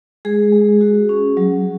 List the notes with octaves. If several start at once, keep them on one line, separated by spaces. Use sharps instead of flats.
G#3 G#4
G#3
F#4
C#4
F#3